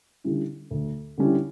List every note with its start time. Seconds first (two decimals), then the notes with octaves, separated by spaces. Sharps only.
0.24 D3 G3 C#4 E4
0.71 D2
1.18 D3 G3 C#4 E4